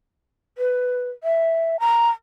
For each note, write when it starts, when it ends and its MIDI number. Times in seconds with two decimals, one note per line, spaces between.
0.58 1.10 71
1.23 1.80 76
1.80 2.09 82